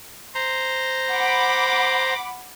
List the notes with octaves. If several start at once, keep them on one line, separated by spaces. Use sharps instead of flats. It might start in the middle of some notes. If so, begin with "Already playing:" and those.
C5 A#5
F#5 B5 D6